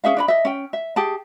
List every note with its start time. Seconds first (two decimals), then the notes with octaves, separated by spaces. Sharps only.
0.04 C#4 G#4 E5 F5
0.17 D4 C#5 B5
0.28 D#5 E5
0.45 C#4 G5
0.73 E5
0.96 G4 G#4 A5